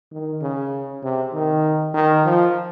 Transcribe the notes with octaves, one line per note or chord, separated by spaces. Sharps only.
D#3
C#3
C3
D#3
D#3
F3